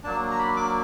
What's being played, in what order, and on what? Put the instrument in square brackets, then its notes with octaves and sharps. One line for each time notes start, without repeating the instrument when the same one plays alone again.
[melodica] F#3 A#3 D4 A5
A#5
B5
D6